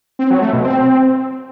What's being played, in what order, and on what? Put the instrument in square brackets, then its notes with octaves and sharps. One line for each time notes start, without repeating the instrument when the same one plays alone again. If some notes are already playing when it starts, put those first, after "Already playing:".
[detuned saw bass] C4
F#3
A3
B2
C4